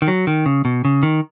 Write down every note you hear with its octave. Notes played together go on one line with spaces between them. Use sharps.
D#3
F#3
D#3
C#3
B2
C#3
D#3